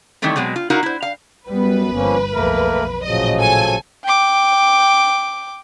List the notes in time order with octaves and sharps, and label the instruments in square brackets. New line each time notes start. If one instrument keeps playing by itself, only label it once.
[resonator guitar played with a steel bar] D#3 E3 G3 A3 C4
B2 F#3 G#3 C4
F4
D#4 E4 F#4 A#4 F5
E4 C5
F5
[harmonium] F#2 [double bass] G3 B3 [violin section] B4
[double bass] G1 [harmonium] F3 A#3 C#4
[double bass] B1 F2 [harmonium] A3 A#3 A#4
[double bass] A1 A#2 [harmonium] C#3 F3 F#3 [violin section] D#5
[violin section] A4 G#5
[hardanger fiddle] G5 D6